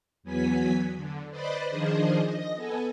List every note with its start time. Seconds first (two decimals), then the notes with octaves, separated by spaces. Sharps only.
0.23 E2 F#3 B3 G#5 G#6 B6
0.95 D3
1.30 B4 C5 D5 D#5 B5 A6
1.70 D#3 F3 D4 G#4 C5 D#5
2.25 D#5 A#6
2.56 B3 A4 G#5